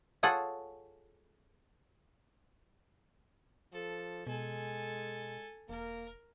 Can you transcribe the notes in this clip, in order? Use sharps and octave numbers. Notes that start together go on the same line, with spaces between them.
F4 G#4 A4 C#5 F#5
F3 A4
B2 G#3 A4 G#5
E1 A#3 A#4